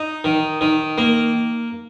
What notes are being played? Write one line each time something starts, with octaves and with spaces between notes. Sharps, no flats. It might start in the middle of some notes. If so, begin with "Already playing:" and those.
Already playing: D#4
D#3
D#3
A#3